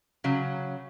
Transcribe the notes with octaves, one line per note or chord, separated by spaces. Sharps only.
C#3 F#3